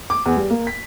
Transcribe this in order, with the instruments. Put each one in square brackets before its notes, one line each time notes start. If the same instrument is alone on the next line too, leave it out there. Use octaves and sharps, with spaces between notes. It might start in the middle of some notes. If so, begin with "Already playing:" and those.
[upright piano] D6
E2
G3
A#3
B6